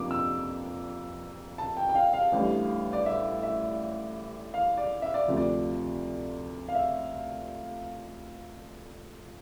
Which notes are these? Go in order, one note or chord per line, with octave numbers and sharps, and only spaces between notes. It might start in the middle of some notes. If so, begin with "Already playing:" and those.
Already playing: F2 C3 F3 A#3 D4 D6
E6
A5
G5
G5
F5
F5
A1 A2 G3 D4
D5
E5
E5
F5
D5
E5
D5
D2 C3 F3
D5
F5
E5